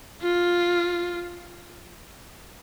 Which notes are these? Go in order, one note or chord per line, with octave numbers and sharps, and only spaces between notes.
F4